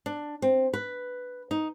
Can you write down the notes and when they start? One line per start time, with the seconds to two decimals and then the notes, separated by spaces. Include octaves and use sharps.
0.06 D4
0.42 C4
0.74 B4
1.51 D#4